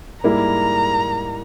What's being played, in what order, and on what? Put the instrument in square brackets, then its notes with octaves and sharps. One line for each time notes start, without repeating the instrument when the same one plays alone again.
[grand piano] G#2 G3 A#3 E4 [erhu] A#5